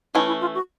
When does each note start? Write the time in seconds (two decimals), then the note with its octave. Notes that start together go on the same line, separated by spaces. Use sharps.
0.14 E3 A3 C#4 D#4
0.27 E4
0.41 F4
0.55 F#4